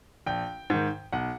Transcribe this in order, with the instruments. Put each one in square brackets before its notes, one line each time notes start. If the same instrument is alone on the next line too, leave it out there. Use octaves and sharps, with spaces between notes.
[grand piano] A#1 G5
G#2 D#3
B1 F#5